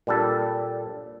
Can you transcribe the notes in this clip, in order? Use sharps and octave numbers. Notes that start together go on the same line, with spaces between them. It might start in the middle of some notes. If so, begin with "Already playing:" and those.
A#2 G3 D4 A4